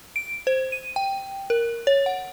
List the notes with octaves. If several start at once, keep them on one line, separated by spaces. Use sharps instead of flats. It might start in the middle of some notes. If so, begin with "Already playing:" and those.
D7
C5
D#7
G5
A#4
C#5
F#5